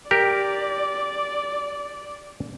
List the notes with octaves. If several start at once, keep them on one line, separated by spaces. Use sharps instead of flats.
G4 A#4 D5